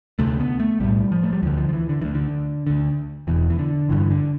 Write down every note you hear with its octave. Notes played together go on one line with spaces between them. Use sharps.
D2 C3 A3
B3
A3
B1 A2 G3
F3
A3
G3
D2 D3 F3
F3
F3
E3
D3
D2 D3 E3
D3
D2 D3
E1 E2 B2 E3
E3
D3
G1 G2 D3 E3
D3